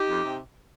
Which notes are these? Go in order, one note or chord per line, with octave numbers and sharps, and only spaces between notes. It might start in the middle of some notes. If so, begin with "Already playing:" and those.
Already playing: D#4 G4
F2
C3